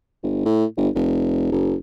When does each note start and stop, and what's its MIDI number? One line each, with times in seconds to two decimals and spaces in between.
0.23 0.42 31
0.45 0.65 45
0.77 0.89 31
0.95 1.51 29
1.52 1.75 30